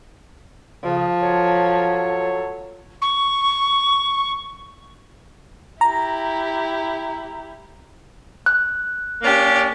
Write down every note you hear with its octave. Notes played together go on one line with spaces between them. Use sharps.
F2 C#3 F3
F#3 A4 C#5
C#6
E4 G4 A#5
F#6
A#3 C#4 D4 G4